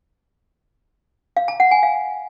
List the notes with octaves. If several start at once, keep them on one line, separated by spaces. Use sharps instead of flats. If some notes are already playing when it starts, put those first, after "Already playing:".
F5
A5
F#5
G#5
F5